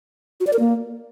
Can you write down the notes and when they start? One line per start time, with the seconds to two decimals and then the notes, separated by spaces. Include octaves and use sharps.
0.40 F#4
0.47 D5
0.53 A#4
0.60 A#3